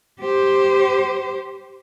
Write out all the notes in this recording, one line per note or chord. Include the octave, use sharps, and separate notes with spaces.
G4 C5